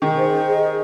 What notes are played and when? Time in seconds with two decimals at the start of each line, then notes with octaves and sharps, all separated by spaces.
0.02 D#3 G#4
0.17 C5
0.31 D#5
0.47 G#4
0.62 G#4